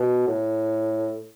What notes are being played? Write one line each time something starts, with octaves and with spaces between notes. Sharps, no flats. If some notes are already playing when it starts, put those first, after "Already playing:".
Already playing: B2
A2